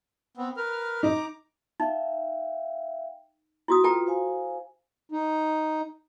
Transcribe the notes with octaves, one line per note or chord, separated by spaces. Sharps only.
B3 C4
A#4 B4 F6
D#4 A#5 D6
D#4 E5 F5 G5
E4 F#4 D#6
F4 A4 B4 G5 A#5
C5 F5 G#5
D#4